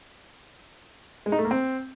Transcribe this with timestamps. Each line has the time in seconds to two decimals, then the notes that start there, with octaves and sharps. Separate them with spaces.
1.26 G#3
1.32 D#4
1.38 A3
1.45 A#3
1.51 C4